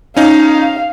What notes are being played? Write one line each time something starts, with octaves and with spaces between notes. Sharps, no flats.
C#4 D#4 F5